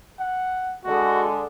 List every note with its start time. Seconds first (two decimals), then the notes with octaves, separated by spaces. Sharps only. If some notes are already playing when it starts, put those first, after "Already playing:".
0.19 F#5
0.84 D3 G#3 F#4